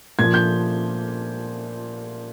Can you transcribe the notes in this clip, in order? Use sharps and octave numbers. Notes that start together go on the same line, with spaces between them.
A#2 F3 G#6
G6